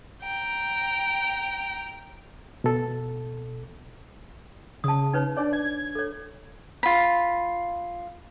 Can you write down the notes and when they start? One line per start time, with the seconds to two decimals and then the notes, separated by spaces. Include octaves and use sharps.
0.23 G5 A#5
2.64 B2 A4
4.84 C#3 A5 D#6
5.13 D#4 B4 C#5
5.37 D4 C#5 D5
5.53 G#6
5.95 A4 C#5
6.83 F4 B5